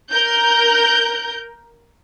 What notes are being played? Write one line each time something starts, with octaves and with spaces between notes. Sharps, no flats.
A#4 G6